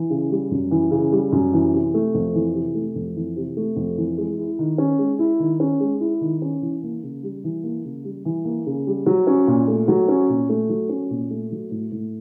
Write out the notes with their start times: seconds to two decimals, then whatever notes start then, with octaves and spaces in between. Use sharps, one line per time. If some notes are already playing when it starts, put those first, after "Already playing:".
Already playing: E3
0.10 C#3
0.31 G3
0.51 F#2
0.71 E3
0.91 C#3
1.12 G3
1.32 F#2
1.53 E3
1.73 C3
1.94 A3
2.14 F2
2.34 E3
2.54 C3
2.75 A3
2.95 F2
3.16 E3
3.36 C3
3.57 A3
3.76 F2
3.97 E3
4.18 G#3
4.38 E4
4.59 D#3
4.78 C#4
4.99 G#3
5.19 E4
5.39 D#3
5.60 C#4
5.80 G#3
6.00 E4
6.21 D#3
6.42 C#4
6.62 E3
6.83 A#3
7.03 C#3
7.23 G3
7.44 E3
7.63 A#3
7.85 C#3
8.04 G3
8.25 E3
8.45 A#3
8.66 C#3
8.87 G3
9.06 F#3
9.27 C#4
9.47 A#2
9.68 A3
9.88 F#3
10.08 C#4
10.29 A#2
10.49 A3
10.69 F#3
10.89 C#4
11.10 A#2
11.30 A3
11.52 F#3
11.71 A2
11.92 A2